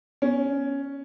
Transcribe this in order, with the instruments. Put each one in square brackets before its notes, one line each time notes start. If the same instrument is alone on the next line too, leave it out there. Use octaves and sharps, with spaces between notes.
[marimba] B3 [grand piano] C#4